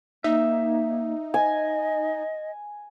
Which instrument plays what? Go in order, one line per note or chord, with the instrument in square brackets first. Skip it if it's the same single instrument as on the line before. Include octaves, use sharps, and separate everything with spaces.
[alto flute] A#3 [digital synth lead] D#4 [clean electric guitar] E5
[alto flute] D#5 [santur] G#5